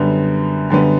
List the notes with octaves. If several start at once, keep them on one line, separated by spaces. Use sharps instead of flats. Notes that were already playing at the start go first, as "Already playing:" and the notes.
Already playing: F#2 D3 G3 B3
F#2 D3 G3 B3